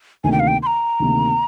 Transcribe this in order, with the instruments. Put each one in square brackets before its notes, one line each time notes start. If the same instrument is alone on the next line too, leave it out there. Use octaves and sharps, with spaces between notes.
[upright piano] D2 C3 D#3 A#3 [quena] G#5
[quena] G5
F5
G5
C6
A#5
[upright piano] D2 C3 D#3 A#3